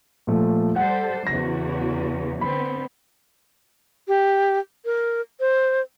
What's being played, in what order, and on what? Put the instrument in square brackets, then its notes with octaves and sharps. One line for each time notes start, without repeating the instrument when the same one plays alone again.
[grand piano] A#2 F3 A3
[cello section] G3 A4 C5 [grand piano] F#5
[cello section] E2 C#3 F#4 [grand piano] A#6
[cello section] D3 B3 C4 [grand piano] B5
[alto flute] G4
A#4
C5